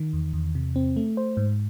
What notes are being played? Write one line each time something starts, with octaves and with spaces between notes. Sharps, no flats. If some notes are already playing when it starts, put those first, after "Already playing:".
Already playing: D#3
E2
E2
C3
C4
A3
C5
G#2